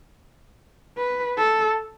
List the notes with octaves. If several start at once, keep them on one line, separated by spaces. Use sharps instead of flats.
B4
A4